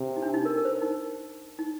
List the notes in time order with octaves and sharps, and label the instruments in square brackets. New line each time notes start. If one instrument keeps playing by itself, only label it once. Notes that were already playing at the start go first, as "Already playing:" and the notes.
Already playing: [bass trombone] C3
[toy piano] D#4
D4
D#4
A#4
A#4
C5
A#4
D#4
D#4